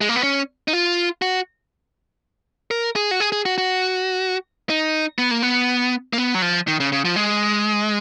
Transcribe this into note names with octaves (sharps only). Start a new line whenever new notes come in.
G#3
A#3
B3
C#4
D#4
F4
F#4
A#4
G#4
F#4
G#4
G#4
F#4
F#4
D#4
B3
A#3
B3
A#3
B3
F#3
F3
D#3
C#3
C#3
F3
G#3